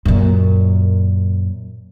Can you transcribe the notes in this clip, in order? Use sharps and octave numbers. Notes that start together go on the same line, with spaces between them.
F#2 A#2